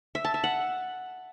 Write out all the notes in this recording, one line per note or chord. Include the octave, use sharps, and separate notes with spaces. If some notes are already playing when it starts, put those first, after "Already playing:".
E5
A5
E5
F#5